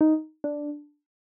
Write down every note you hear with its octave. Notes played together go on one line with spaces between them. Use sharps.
D#4
D4